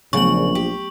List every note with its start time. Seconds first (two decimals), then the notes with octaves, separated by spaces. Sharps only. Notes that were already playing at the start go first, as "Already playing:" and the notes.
0.13 A#1 C#3 F#3 A3 B3 C#6 F#7
0.55 G4